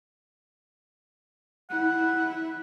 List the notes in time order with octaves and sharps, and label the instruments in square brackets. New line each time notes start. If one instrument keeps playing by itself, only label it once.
[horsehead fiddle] E4 [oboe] F#5